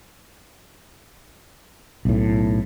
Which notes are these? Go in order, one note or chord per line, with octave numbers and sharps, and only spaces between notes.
B1 A2